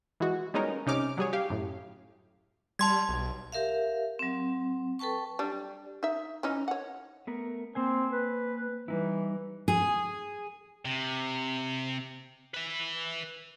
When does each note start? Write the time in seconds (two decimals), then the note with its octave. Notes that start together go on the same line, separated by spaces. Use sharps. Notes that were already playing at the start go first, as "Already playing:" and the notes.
0.20 E3 G#3 F#4
0.54 G3 G#3 B3 C#4 D#4 A#4
0.86 C2 C3 C#4 D#4 D6 F6
1.17 F#3 G3 G#4 C#5
1.33 G4 F5
1.50 F#2 A2
2.79 G3 A5 C6 G#6
3.09 B1
3.52 G4 A#4 E5 F5
4.19 F#3 C4
4.99 A4 B4 G5 A5 C#6
5.39 G3 D4
6.03 D#4 E5
6.43 E3 C#4 D#4
6.68 C#5 F#5
7.27 A3 B3 A#4
7.75 A#3 C4 C5 G#5
8.12 B4
8.88 E3 G3 D#4 E4
9.68 G#4
10.85 C3
12.54 B4 E5